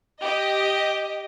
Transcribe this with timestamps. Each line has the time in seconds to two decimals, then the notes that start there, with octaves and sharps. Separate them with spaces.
0.23 G4 D#5